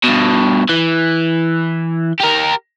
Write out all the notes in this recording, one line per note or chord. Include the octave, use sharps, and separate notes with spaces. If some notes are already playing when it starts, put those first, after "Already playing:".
G2 B2
E3
G4 A#4